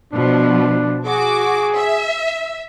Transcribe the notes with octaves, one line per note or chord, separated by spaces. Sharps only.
B2 F3 D4
F#4 G#4 D6
E5